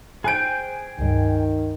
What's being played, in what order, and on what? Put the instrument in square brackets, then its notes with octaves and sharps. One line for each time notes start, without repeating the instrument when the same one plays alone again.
[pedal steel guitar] G#4 G5 [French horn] C5 [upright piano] G#5 F#6 D7
[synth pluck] C#2 G2 [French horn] D#3